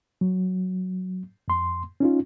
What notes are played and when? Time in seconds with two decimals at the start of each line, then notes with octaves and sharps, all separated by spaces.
0.21 F#3
1.48 F2 C6
2.00 C#4 D#4 F4